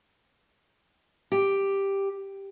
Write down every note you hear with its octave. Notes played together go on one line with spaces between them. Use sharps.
G4